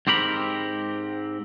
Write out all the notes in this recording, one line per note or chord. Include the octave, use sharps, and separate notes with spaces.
G#2 C4 G4 A#4 B5